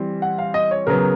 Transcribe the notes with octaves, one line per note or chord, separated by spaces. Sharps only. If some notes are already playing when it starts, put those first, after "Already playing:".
Already playing: E3 G3 C4
F#5
F5
D#5
C#5
C#3 F#3 B3 A#4